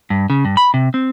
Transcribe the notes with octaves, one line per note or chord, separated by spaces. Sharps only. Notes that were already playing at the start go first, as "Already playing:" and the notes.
G2
C#3
G2
B5
C3
C4